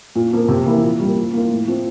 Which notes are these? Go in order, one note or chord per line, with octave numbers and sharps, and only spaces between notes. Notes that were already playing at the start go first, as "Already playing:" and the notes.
A#2
F3 A#3
C3
E3 A#3 E4
A#2
G3 A#3
F3
A#3 F4
A2
F3 C4